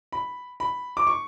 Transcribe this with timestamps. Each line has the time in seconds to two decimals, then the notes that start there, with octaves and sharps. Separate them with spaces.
0.12 B5
0.60 B5
0.97 D6
1.07 C#6